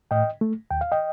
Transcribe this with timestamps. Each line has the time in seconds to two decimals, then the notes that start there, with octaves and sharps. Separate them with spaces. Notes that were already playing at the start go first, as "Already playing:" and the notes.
0.11 A2 D#5 G5
0.41 A3
0.71 D#2 G5
0.81 F5
0.92 D#5 G5